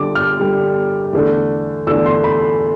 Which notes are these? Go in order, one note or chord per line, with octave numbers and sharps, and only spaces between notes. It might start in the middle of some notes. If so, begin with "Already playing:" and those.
Already playing: D3 G3 D4 D6
F6
D3 G3 D4
E2 D3 A3 D4
E2 D3 A3 D4 E6
C6
B5